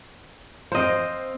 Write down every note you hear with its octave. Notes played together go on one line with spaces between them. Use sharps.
C4 C5 D#5 F5